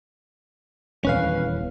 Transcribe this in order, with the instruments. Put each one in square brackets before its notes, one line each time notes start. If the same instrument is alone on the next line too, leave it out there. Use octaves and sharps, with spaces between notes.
[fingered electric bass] D#1 E2 [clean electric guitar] C#4 B4 F5